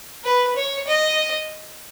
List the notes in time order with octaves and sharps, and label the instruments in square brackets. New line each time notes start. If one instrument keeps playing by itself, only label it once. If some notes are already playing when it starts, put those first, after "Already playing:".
[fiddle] B4
C#5
D#5